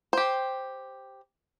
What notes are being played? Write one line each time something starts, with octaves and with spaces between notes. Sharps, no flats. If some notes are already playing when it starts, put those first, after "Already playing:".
G4 C5